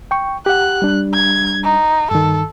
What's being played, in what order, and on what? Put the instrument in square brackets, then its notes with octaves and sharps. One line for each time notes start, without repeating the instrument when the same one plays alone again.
[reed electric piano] G5 C#6
[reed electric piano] G4 F#5 [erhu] F#6
[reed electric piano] G3 D4
[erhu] G#6
D#4
[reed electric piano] G2 D#3 [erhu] A4